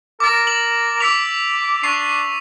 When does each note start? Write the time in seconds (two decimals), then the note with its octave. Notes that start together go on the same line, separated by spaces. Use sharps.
0.20 A#4 D6 A6
0.47 A#4 F#7
1.00 D6 E6 B6 F7
1.83 D4 C#6 C7